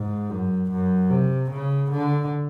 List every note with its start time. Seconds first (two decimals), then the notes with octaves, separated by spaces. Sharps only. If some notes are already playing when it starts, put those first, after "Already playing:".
Already playing: G#2
0.30 F#2
0.71 F#2
1.10 C3
1.51 C#3
1.91 D3